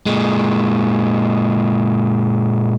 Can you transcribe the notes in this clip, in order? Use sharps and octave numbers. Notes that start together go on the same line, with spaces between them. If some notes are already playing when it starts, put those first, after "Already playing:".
A#2 G#3